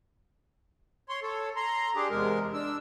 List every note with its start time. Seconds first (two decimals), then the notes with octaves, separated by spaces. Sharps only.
1.09 C#5 C6
1.23 A4 C#5
1.56 A#5 C6
1.96 D4 G4 G#4
2.10 E2 C3 G#3 A#4
2.54 D4 E6